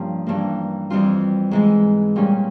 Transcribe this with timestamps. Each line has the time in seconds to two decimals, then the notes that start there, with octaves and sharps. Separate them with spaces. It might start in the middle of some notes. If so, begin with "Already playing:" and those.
Already playing: G2 F3 A#3 C#4
0.26 G2 E3 A#3
0.90 F2 E3 G3 C4 F4
1.51 G#2 E3 G#3
2.16 A#2 G3 C#4